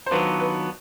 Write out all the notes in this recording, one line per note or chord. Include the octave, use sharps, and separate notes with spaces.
C5
D#3 F#3 B3 D4 F4 B4
B4